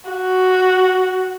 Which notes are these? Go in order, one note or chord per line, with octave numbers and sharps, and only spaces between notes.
F#4